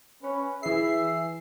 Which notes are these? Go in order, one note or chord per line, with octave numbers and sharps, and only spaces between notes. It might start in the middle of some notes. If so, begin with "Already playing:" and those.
C#4 B4
E3 G#4 E5 C7